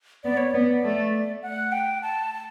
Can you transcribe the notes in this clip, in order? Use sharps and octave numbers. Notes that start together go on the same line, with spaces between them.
B3 D5
C#5
B3 D5
A3
F#5
G5
A5
A5